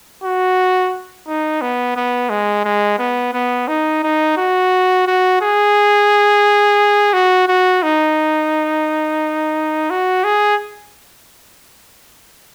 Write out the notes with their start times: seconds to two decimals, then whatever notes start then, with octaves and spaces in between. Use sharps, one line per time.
0.24 F#4
1.27 D#4
1.61 B3
1.96 B3
2.30 G#3
2.65 G#3
2.99 B3
3.33 B3
3.68 D#4
4.03 D#4
4.37 F#4
5.07 F#4
5.42 G#4
7.13 F#4
7.48 F#4
7.83 D#4
9.90 F#4
10.24 G#4